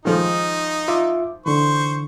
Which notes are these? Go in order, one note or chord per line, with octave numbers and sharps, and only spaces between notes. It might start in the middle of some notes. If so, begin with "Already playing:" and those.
D#3 F3 G#3 D#4
F4 E5 D6
D3 E3 C5 C#6